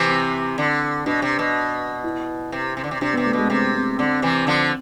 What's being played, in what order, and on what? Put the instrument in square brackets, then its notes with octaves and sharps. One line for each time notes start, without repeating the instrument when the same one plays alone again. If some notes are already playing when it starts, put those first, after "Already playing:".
Already playing: [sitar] C3 E3
[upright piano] C4
[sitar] D3
[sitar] B2 [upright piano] D4
[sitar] C3
B2
[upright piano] E4
[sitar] C3
C3
D3
C3
[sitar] C3 [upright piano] D4
[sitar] C3 [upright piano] B3
[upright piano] A3
[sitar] B2 [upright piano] G#3
[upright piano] C4
[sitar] C3 [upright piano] B3
[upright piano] C4
[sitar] D3 [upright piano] C4
[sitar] C3 E3
D3 F3